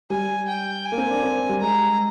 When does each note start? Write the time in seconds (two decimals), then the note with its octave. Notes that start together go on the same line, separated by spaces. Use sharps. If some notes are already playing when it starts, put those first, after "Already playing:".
0.10 G3 G#5
0.48 G5
0.85 G#5
0.92 A#3
0.98 C4
1.10 D4
1.23 C4
1.49 G3
1.61 G#3 A#5